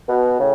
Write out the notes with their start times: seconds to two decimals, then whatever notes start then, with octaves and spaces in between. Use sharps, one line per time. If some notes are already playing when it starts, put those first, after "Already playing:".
0.09 B2
0.40 A2 C#3